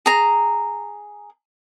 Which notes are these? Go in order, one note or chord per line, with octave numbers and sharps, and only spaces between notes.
G#4 A#5